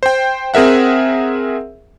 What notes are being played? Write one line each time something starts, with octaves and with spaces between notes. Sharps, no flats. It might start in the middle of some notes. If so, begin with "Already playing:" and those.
C5 G5
C4 G#4 A#4 E5 F#5